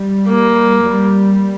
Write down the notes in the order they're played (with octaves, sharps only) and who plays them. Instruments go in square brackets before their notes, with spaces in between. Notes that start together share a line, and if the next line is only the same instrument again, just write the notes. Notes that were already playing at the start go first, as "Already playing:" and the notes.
Already playing: [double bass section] G3
[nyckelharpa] A#3
[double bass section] G3